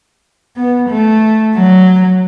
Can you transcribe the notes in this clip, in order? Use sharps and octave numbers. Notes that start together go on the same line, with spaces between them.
B3
A3
F#3